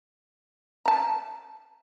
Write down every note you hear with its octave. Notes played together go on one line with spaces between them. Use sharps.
A5 A#5